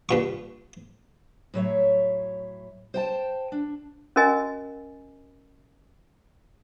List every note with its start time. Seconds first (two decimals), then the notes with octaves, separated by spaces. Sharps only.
0.09 G2 A#2 C#6
1.54 A2 F#3 C#5 E5
2.94 C5 G5 A5
3.52 D4
4.16 C#4 F#4 A#4 D#5 G#5